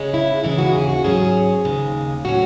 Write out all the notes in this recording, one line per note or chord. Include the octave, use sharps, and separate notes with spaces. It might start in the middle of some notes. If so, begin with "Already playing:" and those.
Already playing: C#3 G#3 C#4
E4
D#2 C#3 E3 G#3 C#4 E4
F#4
G#4
F#4
G#2 F#3 C#4 G#4
D#2 C#3 G#3
A2 F#3 C#4 F#4